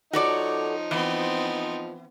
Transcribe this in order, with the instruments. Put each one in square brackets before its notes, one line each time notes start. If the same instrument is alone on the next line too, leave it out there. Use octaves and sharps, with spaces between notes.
[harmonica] F3 D#4 [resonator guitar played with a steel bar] F#4 A4 D5 [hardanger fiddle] C#5
[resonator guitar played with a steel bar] E3 [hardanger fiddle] B3 C4